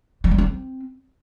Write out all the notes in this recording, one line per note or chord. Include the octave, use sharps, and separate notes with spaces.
F#3
G3
C4